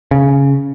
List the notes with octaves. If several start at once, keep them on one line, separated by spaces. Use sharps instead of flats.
C#3